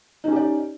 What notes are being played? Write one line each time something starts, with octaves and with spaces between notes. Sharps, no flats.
C#4 D#4 G4 D5